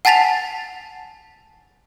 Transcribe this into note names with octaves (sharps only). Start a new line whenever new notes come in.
F#5 G#5 A5 A6 B6 F7